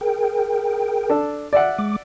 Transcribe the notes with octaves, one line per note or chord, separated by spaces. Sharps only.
G#4 A#4 G5
D4 A4
D5 E5 F#5
G#3 D6